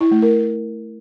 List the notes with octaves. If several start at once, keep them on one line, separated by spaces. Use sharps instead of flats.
E4
A3
A#4